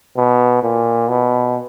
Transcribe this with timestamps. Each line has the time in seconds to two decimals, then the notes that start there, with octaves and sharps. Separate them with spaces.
0.17 B2
0.63 A#2
1.09 B2